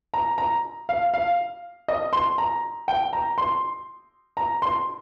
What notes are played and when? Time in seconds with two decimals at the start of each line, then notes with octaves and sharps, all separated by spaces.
0.14 A#5
0.38 A#5
0.89 F5
1.14 F5
1.88 D#5
2.13 C6
2.38 A#5
2.88 G5
3.13 A#5
3.38 C6
4.37 A#5
4.62 C6